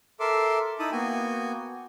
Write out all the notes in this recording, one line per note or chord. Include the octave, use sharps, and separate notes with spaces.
A4 A#4 E5 C6 D6
D#4 E4 A5 B5 D#6
A#3 B3 F#4 G5 G#5